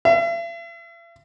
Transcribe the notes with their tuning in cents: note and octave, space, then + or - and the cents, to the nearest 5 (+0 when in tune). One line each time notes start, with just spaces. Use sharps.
E5 +45